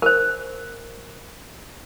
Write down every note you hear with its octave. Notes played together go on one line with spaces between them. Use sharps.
A#4 C5